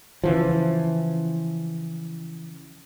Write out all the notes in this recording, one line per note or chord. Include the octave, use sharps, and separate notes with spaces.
C#3 E3 F3